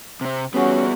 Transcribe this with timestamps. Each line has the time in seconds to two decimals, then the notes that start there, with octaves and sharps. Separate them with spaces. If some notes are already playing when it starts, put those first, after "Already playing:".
0.21 C3 C4
0.54 G3 B3 C#4 F#4 G#4